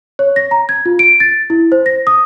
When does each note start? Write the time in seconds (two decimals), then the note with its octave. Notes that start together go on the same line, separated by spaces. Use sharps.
0.19 C#5
0.36 A#6
0.51 A#5
0.69 G#6
0.86 F4
0.99 D7
1.20 A6
1.50 E4
1.72 C5
1.86 A#6
2.07 D#6